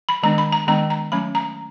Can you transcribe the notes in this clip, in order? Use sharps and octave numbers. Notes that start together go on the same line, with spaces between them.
B5
D#3 G#3 B3 D4 A#5
B5
A#5
D#3 G#3 B3 D4 A#5
A#5
F#3 A3 C#4 B5
A#5